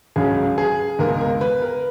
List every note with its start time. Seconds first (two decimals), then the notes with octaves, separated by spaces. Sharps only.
0.16 C#2 C#3 F#3 C#4 G#4
0.58 G#4
0.99 C#2 B2 G#3 A#4
1.21 A#4
1.41 B4
1.62 A#4